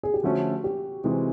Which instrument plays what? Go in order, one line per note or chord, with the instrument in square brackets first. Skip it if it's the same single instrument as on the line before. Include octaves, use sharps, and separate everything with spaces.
[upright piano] G#4
G4
[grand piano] D3 F3 A3 C#4 [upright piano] F#4
[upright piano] G4
[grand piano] C3 E3 G#3 C4